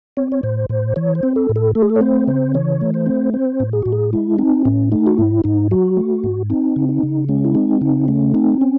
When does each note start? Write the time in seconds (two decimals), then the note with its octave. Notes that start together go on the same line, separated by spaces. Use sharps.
0.17 C4 C#5
0.32 C#5
0.43 A2 C5
0.69 A2 C5
0.96 E3 C#5
1.15 C5
1.23 C4
1.36 A4
1.49 A2
1.56 A4
1.75 A3 A4
1.82 G#4
1.90 A4
1.96 C#5
2.01 C4 C5
2.28 C#3 C5
2.54 E3 C#5
2.81 A3
2.94 C5
3.06 C4
3.34 C4 C5
3.60 A2
3.73 G#4
3.82 A2 F#4
3.92 G#4
4.13 G#3 E4
4.38 C4 D#4
4.65 A2 C#4
4.91 A3 D#4
5.07 F#4
5.18 G#2 E4
5.44 G#2 D#4
5.71 F#3 F#4
5.97 A3
6.24 G#2
6.50 C4 D#4
6.76 C#3
6.89 D#4
7.03 C#3
7.29 G#3 C#4
7.45 E4
7.55 C4 D#4
7.81 C#3 D#4
8.08 A3 C#4
8.34 C4 D#4
8.61 C#4